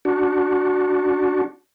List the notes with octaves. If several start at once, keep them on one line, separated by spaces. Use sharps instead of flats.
D4 F#4